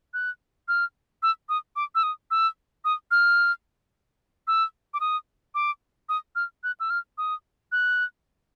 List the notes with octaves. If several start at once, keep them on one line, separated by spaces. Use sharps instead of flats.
F#6
F6
E6
D#6
D6
E6
D#6
E6
D#6
F6
E6
D6
D#6
D6
D#6
F6
F#6
E6
F6
D#6
F#6